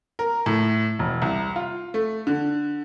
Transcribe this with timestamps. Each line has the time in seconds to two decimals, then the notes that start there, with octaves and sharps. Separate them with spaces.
0.19 A#4
0.46 A2
0.99 E1
1.22 C2
1.56 F4
1.94 A3
2.27 D3